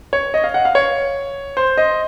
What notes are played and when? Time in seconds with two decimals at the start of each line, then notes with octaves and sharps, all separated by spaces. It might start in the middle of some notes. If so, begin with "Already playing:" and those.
0.13 C#5
0.34 D#5
0.44 F5
0.54 F#5
0.65 F5
0.75 C#5
1.57 C5
1.77 D#5